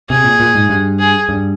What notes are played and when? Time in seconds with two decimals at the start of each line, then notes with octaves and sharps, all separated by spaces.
0.10 C3 G#4
0.24 A#2
0.40 A#2
0.55 G#2
0.69 G2
0.99 G#4
1.29 G2